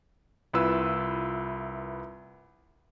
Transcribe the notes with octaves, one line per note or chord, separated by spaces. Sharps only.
C2 E4 F4 B4 E6